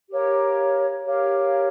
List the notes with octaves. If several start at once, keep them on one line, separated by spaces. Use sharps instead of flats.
G4 A#4 C#5 F5
G4 A#4 C#5 F5